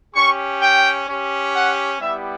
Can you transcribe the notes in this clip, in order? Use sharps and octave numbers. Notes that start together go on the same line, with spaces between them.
C#4 G4 C#6
G5
C#4 G4
F#5
G3 B3 E4 G4 E5